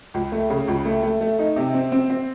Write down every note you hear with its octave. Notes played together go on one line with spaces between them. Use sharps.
C#2
A3
C#3
C#2
A3
A3
A3
D#4
C3
C4
C4
C4